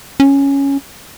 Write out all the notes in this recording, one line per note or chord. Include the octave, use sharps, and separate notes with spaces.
C#4